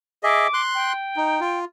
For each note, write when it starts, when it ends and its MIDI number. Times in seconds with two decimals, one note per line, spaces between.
0.23 0.47 68
0.23 0.47 75
0.23 0.47 76
0.23 0.61 86
0.54 0.93 84
0.54 0.93 90
0.74 1.59 79
1.17 1.40 63
1.41 1.65 65